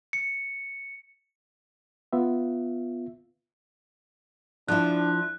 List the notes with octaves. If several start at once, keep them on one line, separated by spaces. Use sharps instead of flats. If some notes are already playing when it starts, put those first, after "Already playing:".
C#7
B3 F4 E5
F3 D4 E4 F#6